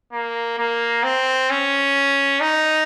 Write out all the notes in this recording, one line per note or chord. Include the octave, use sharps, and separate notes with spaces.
A#3
A#3
C4
C#4
D#4